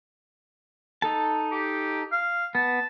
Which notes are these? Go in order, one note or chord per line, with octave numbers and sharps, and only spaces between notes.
D#4 A4 A5
G4
F5
B3 A5